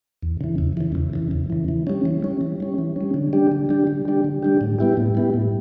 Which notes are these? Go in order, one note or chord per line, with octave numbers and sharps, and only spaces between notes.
E2
C#3 E3
E2
C#3 E3
E2
C#3 E3
E2
C#3 E3
E3
G3 C#4
E3
G3 C#4
E3
G3 C#4
E3
G3 C#4
D3
G3 D4 G4
D3
G3 D4 G4
D3
G3 D4 G4
D3
G3 D4 G4
A2
G3 B3 E4 G4
A2
G3 B3 E4 G4
A2